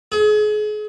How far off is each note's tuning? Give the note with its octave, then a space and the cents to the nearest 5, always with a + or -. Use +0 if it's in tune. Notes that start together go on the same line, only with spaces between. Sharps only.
G#4 +35